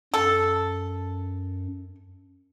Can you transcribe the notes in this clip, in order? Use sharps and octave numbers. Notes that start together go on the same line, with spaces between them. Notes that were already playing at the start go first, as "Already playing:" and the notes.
F#2 A4